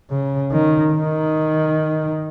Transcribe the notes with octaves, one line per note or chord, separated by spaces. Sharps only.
C#3
D#3
D#3